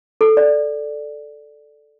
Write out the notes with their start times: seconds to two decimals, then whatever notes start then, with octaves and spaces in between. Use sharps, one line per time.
0.21 A4
0.37 D5